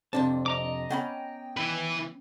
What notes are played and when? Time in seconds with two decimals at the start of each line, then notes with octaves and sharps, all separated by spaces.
0.13 F2 C3 C4 D4 D5 A5
0.46 D#5 A#5 D6
0.90 B3 C#4 G5 B5
1.57 E3 B4